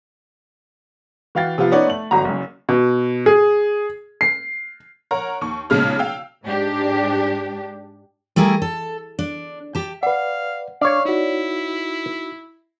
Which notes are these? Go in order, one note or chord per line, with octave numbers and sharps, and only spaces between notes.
E3 F#4 F5 G5 A6
C3 F3 B3 F4
B3 C#4 D#4 C#5 D5 F#5
A3 F#7
G1 F#3 A#5
F#1 F#2
B2
G#4
C7
A#4 C#5 F#5 A#5
D#2 C#6
B1 A#2 C#3 G#3 F6
F5 G5 E6
G#2 D4 G4
G3 A3 E4 G#4 A#4
A4
D4
G4 A5
B4 D5 F5 F#5
D4 C#5 D5 F5
D#4 E4 F#4